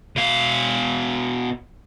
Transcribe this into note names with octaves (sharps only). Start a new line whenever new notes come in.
B2 F5